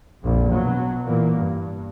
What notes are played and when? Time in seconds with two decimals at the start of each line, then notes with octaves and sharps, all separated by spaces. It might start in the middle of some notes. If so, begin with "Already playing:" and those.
0.21 A#1 F2
0.52 B2 F#3
1.05 A#2 E3 A#3
1.35 G2